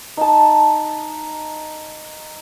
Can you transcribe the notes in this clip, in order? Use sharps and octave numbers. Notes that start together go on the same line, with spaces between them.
D#4 A5